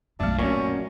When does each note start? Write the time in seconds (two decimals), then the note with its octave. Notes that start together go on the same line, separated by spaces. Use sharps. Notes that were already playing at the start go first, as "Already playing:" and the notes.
0.20 B1 F#2 G#3 A3 D4
0.39 F#2 A#2 C4 C#4